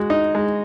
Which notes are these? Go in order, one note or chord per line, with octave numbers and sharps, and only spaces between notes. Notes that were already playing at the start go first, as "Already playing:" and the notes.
Already playing: G#3 F#4
D#4
G#3